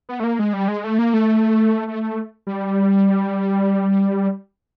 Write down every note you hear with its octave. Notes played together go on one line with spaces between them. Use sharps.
B3
A3
A#3
G#3
G3
G#3
A3
A#3
A3
A3
G3